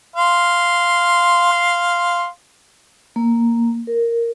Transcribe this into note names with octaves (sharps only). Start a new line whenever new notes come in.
F5 C6
A#3
A#4